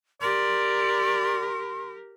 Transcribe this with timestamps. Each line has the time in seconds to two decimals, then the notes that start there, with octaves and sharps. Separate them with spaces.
0.21 G4 A#4 D5 C6